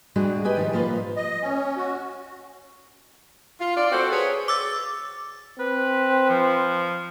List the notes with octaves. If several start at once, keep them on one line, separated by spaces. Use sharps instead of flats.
G3 G#3 D4 F#4 G#4
G4 B4 D#5 G#5
D#3 F3 G3
F3 A#3 F4 B4
D#5
C#4
F#4
F4
F4 D5
C4 F#4 A4 C5
G#4 B4 C#5
D6 E6 A6
C4 B4
F3